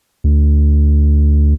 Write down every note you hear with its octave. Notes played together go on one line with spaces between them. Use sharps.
D2